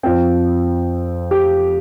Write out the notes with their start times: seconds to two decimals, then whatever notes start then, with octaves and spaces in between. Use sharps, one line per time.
0.03 F2 F3 C4 G5
1.31 G4